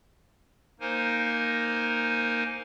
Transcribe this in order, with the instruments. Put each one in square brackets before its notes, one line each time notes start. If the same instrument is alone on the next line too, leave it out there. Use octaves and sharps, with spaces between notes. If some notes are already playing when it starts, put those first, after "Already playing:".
[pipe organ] A#3 D#4 A#4 C5 G#5